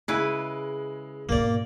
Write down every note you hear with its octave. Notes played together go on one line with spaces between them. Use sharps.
C#3 G#3 E4 B4
G#2 B2 A#3 D5